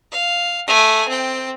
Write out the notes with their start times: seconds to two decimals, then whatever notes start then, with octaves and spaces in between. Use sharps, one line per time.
0.12 F5
0.68 A3 G#5
1.08 C4 G5